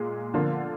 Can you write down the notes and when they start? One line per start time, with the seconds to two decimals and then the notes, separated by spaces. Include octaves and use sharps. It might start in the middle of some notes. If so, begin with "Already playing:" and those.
Already playing: A#2 G#3 G#4
0.34 D3 F3 A#3 F4